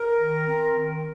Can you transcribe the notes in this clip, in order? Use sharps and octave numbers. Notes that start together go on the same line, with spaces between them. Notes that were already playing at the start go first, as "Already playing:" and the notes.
Already playing: A#4
D#3
C4
D#3